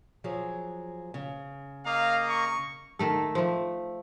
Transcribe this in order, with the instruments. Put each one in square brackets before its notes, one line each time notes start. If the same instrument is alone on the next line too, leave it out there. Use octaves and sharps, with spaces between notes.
[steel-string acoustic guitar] F3 F#3 G#4
C#3
[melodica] A#3 D#5 A#5 [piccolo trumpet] F5
[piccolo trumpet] C#6
[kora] D#3 A3 A4
F3 A3